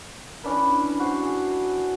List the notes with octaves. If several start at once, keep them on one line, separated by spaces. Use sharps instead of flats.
C#4 D4 E4 B4
F#4 C5
G#4